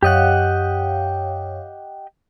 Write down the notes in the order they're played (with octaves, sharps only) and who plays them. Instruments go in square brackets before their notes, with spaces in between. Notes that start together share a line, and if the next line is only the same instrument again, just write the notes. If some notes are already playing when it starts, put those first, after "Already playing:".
[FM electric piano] F#2 C#5 F5 [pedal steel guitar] G4 D#5 F#5